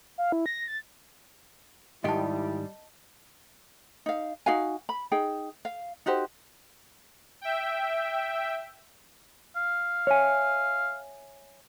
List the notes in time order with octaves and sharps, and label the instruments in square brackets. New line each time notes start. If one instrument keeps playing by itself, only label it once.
[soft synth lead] F5
E4
A#6
A6
[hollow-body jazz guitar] G#2 D#3 G4 [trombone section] G3 [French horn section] E4 [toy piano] D#5 A5
[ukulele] D#4 F5
D#4 F#4 F5 G#5
B5
D#4 G#4 G5
F5
D#4 F#4 G4 C5
[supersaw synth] E5 G5
[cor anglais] F5
[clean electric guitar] C#5 E5 G#5